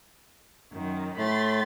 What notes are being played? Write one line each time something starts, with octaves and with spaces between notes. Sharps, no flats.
F#2 D#3
A2 A3 B5 C6 A6